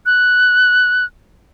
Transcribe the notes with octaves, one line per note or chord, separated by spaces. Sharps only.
F#6